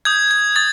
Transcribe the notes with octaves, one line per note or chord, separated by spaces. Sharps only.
D#6 G6 G#6
G#6
D#6 A6